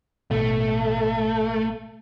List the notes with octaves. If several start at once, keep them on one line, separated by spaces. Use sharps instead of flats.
A1 B2 A3